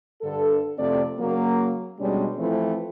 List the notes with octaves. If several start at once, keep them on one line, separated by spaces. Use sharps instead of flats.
G2 D3 A4
F2 C3 A3 C4 D5
C#3 F#3 A#3
B2 G3 G#3 C#4 D4
E3 F3 A3 C4